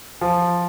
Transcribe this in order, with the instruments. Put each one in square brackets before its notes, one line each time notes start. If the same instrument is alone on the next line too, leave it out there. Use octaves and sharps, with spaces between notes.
[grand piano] F3